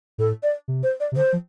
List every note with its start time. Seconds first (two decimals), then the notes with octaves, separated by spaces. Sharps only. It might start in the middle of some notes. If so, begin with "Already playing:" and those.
0.18 A2 A4
0.43 D5
0.68 C3
0.83 C5
1.00 D5
1.12 C3
1.16 D3 C5
1.33 F3